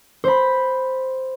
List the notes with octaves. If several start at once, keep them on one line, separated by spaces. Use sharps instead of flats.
C5 B5